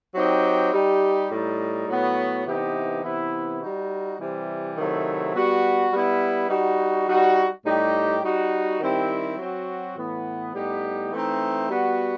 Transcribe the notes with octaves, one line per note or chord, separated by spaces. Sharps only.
F#3 C4 D#4 G4
G3 D#4 G4
A2 G3 D#4
A2 F#3 B3 F#4
C3 E3 B3 D#4 G4
C3 E3 B3 E4
G3 D#4 F#4
C3 E3 G3
C3 D#3 F#3 A3 E4
G3 B3 F#4
G3 B3 E4
G3 D#4 F#4
G3 D#4 F#4
A2 G3 D#4 G4
G3 D#4 F#4
D#3 G3 C4 E4 G4
F#3 C4 F#4
A2 E3 B3
A2 G3 B3 D#4 G4
E3 A3 C4 D#4
G3 B3 F#4